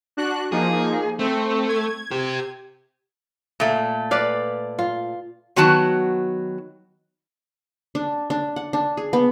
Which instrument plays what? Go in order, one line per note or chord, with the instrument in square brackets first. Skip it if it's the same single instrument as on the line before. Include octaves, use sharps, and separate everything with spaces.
[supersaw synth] D4 F#4 F#6
[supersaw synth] F3 A#3 D#4 [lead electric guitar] G#4
[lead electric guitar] A3 [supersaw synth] C4
[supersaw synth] G#6
[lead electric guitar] G4 C5
[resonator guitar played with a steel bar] A#2 A3
[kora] B4 D5 F5
F4
[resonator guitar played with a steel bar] D#3 F#3 B3 F#4 A5
[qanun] D4
D4
F#5
D4
G#4
B3